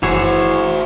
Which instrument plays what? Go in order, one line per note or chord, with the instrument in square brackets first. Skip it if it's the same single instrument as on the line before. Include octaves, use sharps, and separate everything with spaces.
[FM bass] F#1 [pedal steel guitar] E3 G#4 C#5 [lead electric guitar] F#4 C5